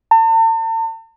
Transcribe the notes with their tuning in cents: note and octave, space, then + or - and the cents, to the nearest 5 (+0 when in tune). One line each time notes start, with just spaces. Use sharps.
A5 +40